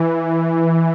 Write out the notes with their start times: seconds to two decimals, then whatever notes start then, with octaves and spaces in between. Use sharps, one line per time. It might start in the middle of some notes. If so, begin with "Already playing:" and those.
Already playing: E3